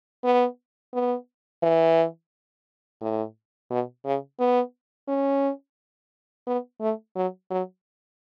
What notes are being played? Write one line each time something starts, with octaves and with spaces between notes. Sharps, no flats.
B3
B3
E3
A2
B2
C#3
B3
C#4
B3
A3
F#3
F#3